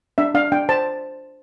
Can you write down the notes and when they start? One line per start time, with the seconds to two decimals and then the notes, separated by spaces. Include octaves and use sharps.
0.18 D4 E5
0.35 D4 F5
0.52 D4 G5
0.69 C5 A5